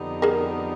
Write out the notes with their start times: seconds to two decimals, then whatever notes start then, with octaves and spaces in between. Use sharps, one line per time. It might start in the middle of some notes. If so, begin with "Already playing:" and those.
Already playing: F2 D3 G3 B3 D#4
0.22 G#4 A#4